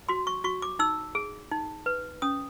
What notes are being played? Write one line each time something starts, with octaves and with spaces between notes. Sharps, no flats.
F#4 C6
C#6
F#4 C#6
D6
D#4 E6
G#4
D#4
B4
C#4 D#6